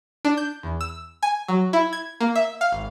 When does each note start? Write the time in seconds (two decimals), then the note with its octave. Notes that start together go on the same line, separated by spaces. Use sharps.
0.25 D4
0.37 G6
0.63 E2
0.81 E6
1.23 G#5
1.48 F#3
1.73 E4
1.93 G#6
2.21 A#3
2.36 E5
2.61 F5
2.72 G#1